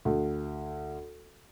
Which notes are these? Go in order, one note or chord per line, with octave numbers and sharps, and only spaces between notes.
D2